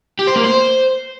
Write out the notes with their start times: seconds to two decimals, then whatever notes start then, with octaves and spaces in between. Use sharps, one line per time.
0.19 G4
0.27 C5
0.36 A#3
0.44 C5